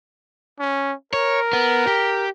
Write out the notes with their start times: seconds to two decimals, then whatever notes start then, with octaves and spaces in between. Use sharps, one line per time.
0.60 C#4
1.13 A#4 C#5
1.53 B3
1.87 G4